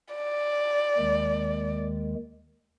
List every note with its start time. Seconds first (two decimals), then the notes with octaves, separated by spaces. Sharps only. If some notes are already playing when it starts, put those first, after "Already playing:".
0.14 D5
0.98 D#2 D#3 G#3